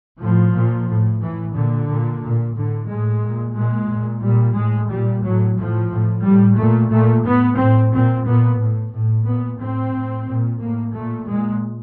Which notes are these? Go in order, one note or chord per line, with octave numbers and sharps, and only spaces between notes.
A2 F3
A#2
A2
A2 E3
A#2 D3
A#2
A#2
A2 D3
A2 G#3
A#2
A#2 G#3
A#2
A#2 G3
A2 G#3
A#2 G3
A2 F#3
A2 F3
A2
A2 G3
A#2 A3
A#2 A3
A2 B3
A2 C4
A#2 C4
A#2 B3
A2
A2
A#2 B3
A2 C4
A2
A#2
A2 A#3
A#2 A3
A#2 G#3